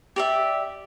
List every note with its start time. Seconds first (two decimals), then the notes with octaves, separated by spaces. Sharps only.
0.16 G4 D5 E5